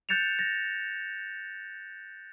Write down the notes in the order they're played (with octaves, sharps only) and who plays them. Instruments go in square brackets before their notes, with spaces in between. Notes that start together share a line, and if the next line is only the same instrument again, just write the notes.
[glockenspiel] F#6 G6 A6 C#7 E7 F7
A6 A#6